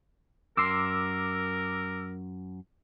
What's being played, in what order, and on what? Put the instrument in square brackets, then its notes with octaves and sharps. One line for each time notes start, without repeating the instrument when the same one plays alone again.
[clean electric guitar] F#2 C6 [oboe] A#4 [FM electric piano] D6 E6